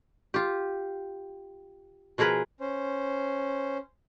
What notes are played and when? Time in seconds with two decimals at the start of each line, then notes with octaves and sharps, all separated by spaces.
0.34 F4 G4
2.18 B2 F3 G#4 A#4 B4
2.60 C#4 C5